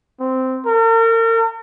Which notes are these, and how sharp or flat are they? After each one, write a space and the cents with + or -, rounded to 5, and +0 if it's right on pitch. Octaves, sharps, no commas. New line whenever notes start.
C4 -10
A#4 -40